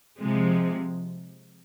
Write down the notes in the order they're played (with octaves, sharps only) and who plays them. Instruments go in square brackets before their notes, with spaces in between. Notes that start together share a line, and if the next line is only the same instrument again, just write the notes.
[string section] C3 F3 G#3